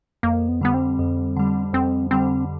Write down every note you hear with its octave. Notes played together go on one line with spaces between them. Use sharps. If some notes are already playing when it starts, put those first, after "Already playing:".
F2 A#3
B3
D3 G3 B3
C4
F2
D3 G3
F2 C4
D3 G3 C4